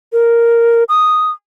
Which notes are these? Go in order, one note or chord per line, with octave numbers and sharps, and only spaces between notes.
A#4
D#6